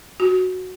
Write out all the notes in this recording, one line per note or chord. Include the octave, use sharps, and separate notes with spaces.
F#4